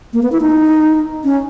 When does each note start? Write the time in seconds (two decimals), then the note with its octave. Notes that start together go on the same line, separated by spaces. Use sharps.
0.13 A#3
0.23 B3
0.32 E4
0.41 D#4
1.24 C#4